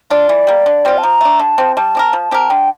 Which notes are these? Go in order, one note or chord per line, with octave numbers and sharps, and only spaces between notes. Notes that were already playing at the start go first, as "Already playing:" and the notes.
D4 F4 D5
E3
G3 A#3
D3
G3 C4 F4
A5
F3 A#5
A3 D4
D3 A5
F3 C4
G3 A5
C4 G4 A#4
F3
C4 G4 A#4
D3 G5